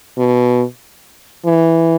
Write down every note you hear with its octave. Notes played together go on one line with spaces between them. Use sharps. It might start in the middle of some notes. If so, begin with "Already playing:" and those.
B2
E3